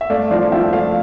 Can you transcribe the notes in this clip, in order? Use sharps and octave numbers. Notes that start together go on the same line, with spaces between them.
E5
A3 D5 F5
F3 D5 F5
F3 E5 G5
A3 D5 F5